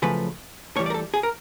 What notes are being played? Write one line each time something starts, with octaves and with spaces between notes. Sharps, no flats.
F#2 C#3 F3 A3 B4
A2 E3 G3 C#5
D5
A#4
A4
G#4
A#4